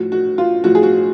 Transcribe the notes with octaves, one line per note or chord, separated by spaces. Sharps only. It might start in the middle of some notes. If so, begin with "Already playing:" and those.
Already playing: A2 F3 F#4
F#4
F4
A2 F3 F#4
G#4
F#4